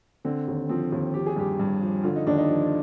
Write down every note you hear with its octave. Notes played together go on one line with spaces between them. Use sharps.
D3 C4
D#2
F3 C4
D#2
F3 G4
G#4
G2 G4
G2
F3
D3 F4
D#4
D#2 D4
D#4
F3